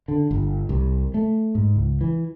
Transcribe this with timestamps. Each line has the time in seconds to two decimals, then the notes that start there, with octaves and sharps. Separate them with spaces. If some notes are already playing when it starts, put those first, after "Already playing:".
0.08 D3
0.31 G1
0.69 C2
1.14 A3
1.55 G#2
1.76 C#2
2.01 E3